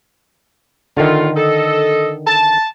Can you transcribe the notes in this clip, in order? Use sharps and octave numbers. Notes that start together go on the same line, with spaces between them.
A2 D3 D#3 F4
A4 D#5
A5